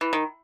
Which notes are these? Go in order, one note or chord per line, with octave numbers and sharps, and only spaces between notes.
E3
D#3